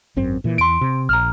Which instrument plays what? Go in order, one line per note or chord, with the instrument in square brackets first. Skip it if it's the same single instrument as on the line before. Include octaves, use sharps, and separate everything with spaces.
[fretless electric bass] G#1 F#2 C4
A#2 E3
[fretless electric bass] E2 [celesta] C6 D7
[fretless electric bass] C3
[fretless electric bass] A#1 [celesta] A#5 F6